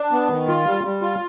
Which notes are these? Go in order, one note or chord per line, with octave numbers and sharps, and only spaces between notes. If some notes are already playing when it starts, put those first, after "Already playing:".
Already playing: D4
B3
D#3
F4
G3
G3
F4